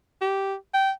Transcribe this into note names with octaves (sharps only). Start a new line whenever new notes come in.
G4
G5